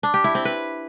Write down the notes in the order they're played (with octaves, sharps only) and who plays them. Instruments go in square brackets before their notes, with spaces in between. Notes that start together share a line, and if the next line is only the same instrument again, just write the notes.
[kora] D4
G4
E4
C4
B4